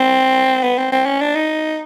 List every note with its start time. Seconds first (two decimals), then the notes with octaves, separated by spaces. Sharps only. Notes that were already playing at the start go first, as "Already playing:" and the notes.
Already playing: C4
0.63 B3
0.78 C4
0.92 C4
1.06 C#4
1.21 D4
1.35 D#4